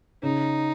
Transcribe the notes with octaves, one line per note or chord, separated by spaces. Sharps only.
C#3 D#4